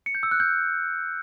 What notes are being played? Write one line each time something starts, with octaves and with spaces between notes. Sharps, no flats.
C#7
G6
E6
F#6
G6